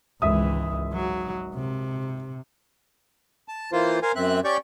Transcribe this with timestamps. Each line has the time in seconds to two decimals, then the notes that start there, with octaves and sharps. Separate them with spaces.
0.22 G#1 C#2 E3 E5 D#6
0.94 F#3
1.54 C3
3.48 A5
3.72 E3 A#3 F4 C5
4.03 A#4 C5 F5 G#5
4.16 F#2 C4 E5 F#6
4.45 C#4 G4 D5 C#6 G6